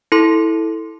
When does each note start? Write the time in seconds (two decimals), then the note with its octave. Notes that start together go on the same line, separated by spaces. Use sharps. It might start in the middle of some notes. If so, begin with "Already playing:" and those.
0.12 E4 A4 C6